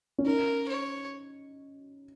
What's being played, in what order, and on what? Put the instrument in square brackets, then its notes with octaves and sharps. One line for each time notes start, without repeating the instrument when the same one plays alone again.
[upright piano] C#4
[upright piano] D#4 [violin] A#4
[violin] C#5